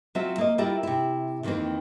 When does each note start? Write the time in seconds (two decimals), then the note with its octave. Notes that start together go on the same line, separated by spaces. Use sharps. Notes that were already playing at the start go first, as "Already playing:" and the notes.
0.15 F#3 C4 F4 E5
0.38 A#3 D#5
0.58 G3 E4 F4 A#4 E5
0.83 C3 E4
1.43 F2 D#3 E3 A#3 C4